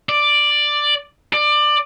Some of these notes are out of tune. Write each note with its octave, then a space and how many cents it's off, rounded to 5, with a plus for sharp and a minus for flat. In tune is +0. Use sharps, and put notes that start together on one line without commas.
D5 +5
D5 +20